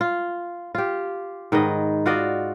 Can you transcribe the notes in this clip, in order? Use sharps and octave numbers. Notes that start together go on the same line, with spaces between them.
F4
F4 G4
G#2 D#3 B4 D#5
F4 F#4 D5 D#5